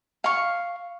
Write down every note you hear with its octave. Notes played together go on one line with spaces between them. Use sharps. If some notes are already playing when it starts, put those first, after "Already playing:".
F5 C#6